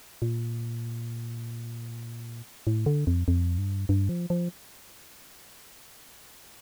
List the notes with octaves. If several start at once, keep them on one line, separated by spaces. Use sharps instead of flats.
A#2
A2
D3
F2
F2
G2
G2
F3
F3